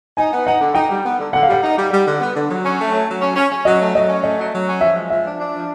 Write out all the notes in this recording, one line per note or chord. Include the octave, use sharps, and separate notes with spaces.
D#4 G#5
B3
D#4 F#5
D3
D#4 G5
G3
B3
D3
D3 F#5
F5
G3 F#5
D#4
G3
G3
D3
B3
D3
F#3
C#4
A3
F#3
F#3
C#4
C#4
C#4
F#3 D#5
A3
F#3 D#5
C#4
A3 D#5
F#3
F#3
C#4
F3 E5
G#3
F3 E5
D4
D4
F3